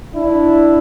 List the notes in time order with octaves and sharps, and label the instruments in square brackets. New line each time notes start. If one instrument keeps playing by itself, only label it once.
[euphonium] D4 [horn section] E4